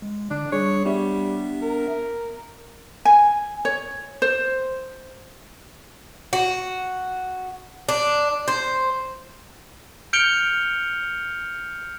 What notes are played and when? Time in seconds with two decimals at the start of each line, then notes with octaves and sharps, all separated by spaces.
0.02 G#3
0.31 D3 D4
0.52 G3 D4 G#4 C#5
0.85 G3 B3 D4 E5
1.62 A#4
3.05 G#5
3.65 C#5
4.22 C5
6.33 F#4
7.89 D4
8.48 C5
10.13 F6 G6 C#7 D7 F7 G7